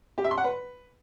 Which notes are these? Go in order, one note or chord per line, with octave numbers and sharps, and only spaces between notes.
G4
E5
C6
F#5
B4